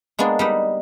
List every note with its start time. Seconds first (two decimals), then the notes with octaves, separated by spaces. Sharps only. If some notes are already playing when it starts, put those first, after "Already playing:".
0.19 G#3 A#3 B3 D4
0.39 G3 D#4 B4